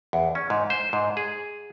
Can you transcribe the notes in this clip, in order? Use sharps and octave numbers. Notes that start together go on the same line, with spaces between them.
E2
C#4
G#2
C5
G#2
G#4